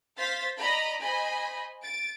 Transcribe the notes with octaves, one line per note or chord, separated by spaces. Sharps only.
C5 F5 A6 B6
D5 D#5 A#5 B5
C5 D#5 G#5 B5
A6 D7